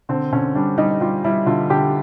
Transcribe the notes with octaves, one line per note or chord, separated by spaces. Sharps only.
D3 C4
D3 C#4
G3 D4
G3 D#4
G3 F4
G3 E4
D3 F4
D3 G4